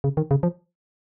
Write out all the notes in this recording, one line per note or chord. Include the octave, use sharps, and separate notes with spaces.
C#3
D#3
C#3
F3